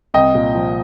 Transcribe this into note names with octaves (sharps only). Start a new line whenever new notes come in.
C2 D#5 G5
A#2
F3